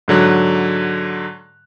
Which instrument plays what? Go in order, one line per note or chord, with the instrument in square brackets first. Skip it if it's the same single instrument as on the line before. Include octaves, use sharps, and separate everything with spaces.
[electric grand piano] G#2 D3 F#3 F#6